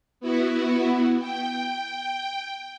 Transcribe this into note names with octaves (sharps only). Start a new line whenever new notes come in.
B3 E4 F#4
G5